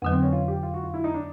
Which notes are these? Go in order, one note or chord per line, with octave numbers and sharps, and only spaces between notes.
F2 D3 F#3 B3
C4
C#4
F4
G4
F4
F#4
F4
E4
D#4
D4